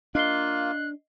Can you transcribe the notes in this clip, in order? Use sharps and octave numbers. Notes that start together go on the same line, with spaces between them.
A#3 D4 F4 D#5 F5 F#6 C7 G7